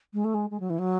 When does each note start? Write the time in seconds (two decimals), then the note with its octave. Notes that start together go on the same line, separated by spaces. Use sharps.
0.13 G#3
0.24 A3
0.34 G#3
0.50 G#3
0.60 F#3
0.70 E3
0.79 F#3